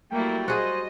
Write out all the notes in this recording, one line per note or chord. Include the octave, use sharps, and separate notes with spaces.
F#3 G3 A3 A#3 E4 G5
F#4 G#4 C5 D#5